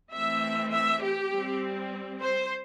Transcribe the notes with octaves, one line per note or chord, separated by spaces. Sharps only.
E3 A3 C4 E5
E5
G4
G3 C4
C5